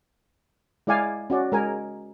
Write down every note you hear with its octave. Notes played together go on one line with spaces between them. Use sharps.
G#3 E4 D5 F5 G#5
C#4 F#4 D5
G#3 A#4 G#5